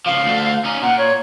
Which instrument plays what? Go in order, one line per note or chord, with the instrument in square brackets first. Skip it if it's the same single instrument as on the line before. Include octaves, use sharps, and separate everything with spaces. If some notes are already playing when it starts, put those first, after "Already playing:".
[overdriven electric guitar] C#3 F3 [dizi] F5
[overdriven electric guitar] D2 A3
C#4 D#4
[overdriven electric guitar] A#2 [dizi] F#5
[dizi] C#5